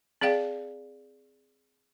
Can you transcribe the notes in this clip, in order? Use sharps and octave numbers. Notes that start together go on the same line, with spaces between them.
C4 G#4 D5 F5 G5